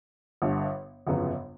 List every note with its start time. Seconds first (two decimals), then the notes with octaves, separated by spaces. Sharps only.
0.42 G1 G2 D3
1.07 G1 F2 C#3 F#3 B3